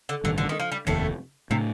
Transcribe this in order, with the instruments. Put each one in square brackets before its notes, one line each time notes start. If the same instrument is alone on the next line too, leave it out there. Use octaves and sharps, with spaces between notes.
[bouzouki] D3
[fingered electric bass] A1 G2 D#3 [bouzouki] D3
[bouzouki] D3
D#3
F3
G3
[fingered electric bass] F1 D#2 D#3 [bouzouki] A2 A3
[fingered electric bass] A2 A3 D4 [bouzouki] C3